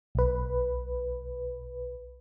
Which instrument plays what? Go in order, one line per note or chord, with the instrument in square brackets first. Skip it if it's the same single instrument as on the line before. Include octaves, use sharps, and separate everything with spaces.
[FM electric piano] B1 B4